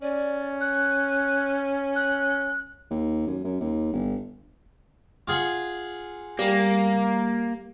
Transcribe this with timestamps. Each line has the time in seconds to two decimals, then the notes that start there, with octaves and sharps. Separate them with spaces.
0.02 C#4 D5
0.61 F#6
1.96 F#6
2.91 D#2
3.27 F#2
3.44 F#2
3.61 D#2
3.93 G1
5.28 F4 G#4 F#5
6.39 G3 A#3